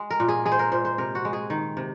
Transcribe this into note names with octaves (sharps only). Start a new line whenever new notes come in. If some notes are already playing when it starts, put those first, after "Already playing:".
Already playing: G#3
A#4
A#2
G#4
G#3 G#4
C5
A#4
A#2 C5
C5
C3 A#4
F#4
G#3
G#4
D#3
C3